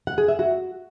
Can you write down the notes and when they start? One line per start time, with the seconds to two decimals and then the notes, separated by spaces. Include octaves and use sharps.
0.07 F#5
0.18 G#4
0.28 E5
0.39 F#4